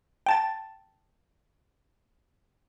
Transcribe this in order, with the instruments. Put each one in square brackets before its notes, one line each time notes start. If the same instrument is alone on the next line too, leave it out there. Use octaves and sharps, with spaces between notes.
[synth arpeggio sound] G5 A5 A6